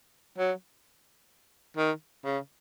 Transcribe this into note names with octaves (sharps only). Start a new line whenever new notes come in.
F#3
D#3
C#3